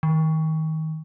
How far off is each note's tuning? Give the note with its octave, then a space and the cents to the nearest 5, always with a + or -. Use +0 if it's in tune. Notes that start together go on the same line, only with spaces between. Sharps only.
D#3 +25